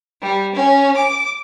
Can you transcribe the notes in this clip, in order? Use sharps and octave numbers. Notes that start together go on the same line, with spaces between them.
G3
C#4
D6